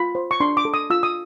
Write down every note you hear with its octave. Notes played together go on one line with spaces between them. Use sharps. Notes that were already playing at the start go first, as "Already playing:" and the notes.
Already playing: F4 B5
C5
C#6
D4 C6
D6
A4
D#6
F4 E6
D#6